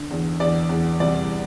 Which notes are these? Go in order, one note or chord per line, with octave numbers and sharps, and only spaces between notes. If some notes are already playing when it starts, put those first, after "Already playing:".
Already playing: D3
E2
E2 D5
E2
C2 D5